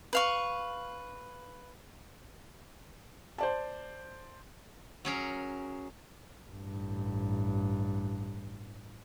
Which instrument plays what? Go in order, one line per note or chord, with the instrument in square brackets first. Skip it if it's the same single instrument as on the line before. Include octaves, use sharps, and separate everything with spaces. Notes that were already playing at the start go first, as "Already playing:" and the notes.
[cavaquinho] B4 F5 C#6
[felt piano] C5 D5 A5
[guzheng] F#3 C#4 G#4 A#4
[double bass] A1 G2